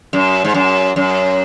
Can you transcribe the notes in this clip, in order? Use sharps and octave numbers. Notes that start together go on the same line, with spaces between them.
F#2
G#2
F#2
F#2